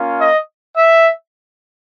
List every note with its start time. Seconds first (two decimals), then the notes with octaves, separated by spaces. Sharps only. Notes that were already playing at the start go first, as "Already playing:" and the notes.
Already playing: A#3 C#4 F4
0.19 D#5
0.75 E5